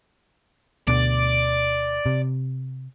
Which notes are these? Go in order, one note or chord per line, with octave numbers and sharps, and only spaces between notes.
D2 B2 D3 D5
C3